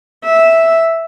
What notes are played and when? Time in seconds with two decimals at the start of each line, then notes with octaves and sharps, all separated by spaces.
0.25 E5